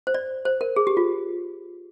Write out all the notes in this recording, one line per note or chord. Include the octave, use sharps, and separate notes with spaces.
C5
D5
C5
A#4
G#4
G4
F4